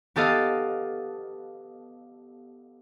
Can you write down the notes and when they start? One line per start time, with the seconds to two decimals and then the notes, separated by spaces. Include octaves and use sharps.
0.16 B3 G4 A4 D#5 F5